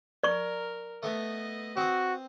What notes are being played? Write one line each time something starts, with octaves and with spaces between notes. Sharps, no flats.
A#4 D5 C#6
A3 B3 B4 D#5
C4 F#4 D#6